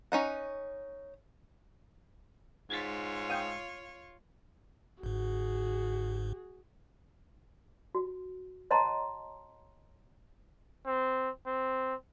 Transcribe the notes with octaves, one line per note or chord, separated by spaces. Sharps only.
C#4 D#4 F#5
G#2 F4 C#5 G#6 A6 B6
F5 G5 D#6
G1 G#2 F#4 G#4
F#4
C#5 D#5 F#5 A5 A#5 C6
C4
C4